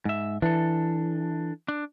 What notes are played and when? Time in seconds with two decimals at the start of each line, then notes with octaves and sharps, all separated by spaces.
0.05 G#2 E5
0.42 E3 D4 A4
1.68 D4